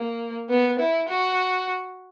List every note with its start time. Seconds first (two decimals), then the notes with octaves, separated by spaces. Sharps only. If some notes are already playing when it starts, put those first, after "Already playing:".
Already playing: A#3
0.50 B3
0.80 E4
1.09 F#4